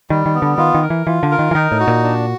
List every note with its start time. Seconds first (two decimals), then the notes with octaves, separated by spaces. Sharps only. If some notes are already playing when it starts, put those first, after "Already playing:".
0.10 D#3 G3
0.26 D#3
0.35 B3
0.42 D3
0.58 D#3 F4
0.74 D#3
0.82 A#4
0.90 E3
1.06 E3 F4
1.23 D3
1.31 A#4
1.39 D#3
1.51 E3
1.55 D#3 D#4
1.72 A2
1.80 F#4
1.88 A#2
2.03 D4